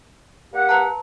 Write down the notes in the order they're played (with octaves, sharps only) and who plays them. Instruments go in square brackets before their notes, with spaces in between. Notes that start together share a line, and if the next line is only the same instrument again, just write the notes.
[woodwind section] A#3 G4 F#5
[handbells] B4 A5 A#5